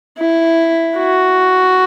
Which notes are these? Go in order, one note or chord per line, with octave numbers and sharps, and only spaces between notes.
E4
F#4